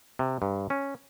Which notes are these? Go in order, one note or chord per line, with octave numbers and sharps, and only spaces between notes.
C3
G2
C#4